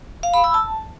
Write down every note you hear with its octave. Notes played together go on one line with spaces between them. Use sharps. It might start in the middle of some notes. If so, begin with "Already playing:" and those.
F5
B5
E6
A5